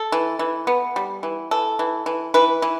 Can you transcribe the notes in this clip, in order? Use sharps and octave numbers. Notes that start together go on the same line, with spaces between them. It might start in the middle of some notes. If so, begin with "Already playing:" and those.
Already playing: A4
E3
E3
B3
G3
E3
E3 A4
E3
E3
E3 B4
E3